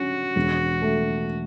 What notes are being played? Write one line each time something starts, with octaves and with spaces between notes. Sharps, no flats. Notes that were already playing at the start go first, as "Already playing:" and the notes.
Already playing: G2 C#4 F#4
E1
A3